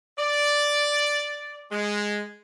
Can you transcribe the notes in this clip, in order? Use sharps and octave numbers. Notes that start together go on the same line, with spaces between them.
D5
G#3